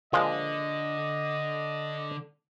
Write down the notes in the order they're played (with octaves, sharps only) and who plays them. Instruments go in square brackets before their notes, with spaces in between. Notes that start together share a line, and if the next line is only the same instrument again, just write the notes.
[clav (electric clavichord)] A#2 F3 G#3 [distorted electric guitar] D3 [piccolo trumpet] D#5